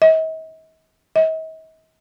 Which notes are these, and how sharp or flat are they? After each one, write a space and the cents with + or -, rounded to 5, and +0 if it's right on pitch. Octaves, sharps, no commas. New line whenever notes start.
D#5 +45
D#5 +45